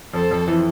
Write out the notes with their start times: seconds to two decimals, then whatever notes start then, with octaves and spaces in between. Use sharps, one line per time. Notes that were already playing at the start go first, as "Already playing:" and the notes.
0.14 F2 A4 C5
0.31 F2
0.48 E3